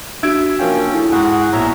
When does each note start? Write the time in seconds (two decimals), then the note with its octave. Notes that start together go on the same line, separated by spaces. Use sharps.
0.23 D4 F#4 E5 E6 G#6 D7
0.59 F3 A#3 C#4 F4 G5
0.94 E4 G#4 A4
1.12 G#2 F#4 G#4 F#5
1.53 A#1 B2 C#5 E5 A#5